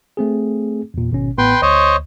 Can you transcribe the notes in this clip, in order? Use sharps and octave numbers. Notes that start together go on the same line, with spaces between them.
A3 C4 G#4
E2 A#2
G#1 B2 C#4
A1 A2 B3 B4 G5 C6
D2 C5 C#5 D#5